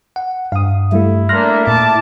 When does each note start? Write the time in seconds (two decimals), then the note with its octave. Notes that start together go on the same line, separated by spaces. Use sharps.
0.16 F#5
0.52 G2 F5 D#6
0.92 G3 A3 E4
1.29 A3 A#3 D4 C6 F6 F#6 A#6
1.67 A#2 A5 D6